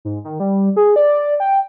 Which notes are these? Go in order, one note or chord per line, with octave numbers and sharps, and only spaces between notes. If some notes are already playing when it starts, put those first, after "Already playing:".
G#2
D#3
G3
G#4
D5
G5